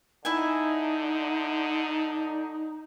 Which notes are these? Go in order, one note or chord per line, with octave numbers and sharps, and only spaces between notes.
D3 D#4 E4 E5 G#5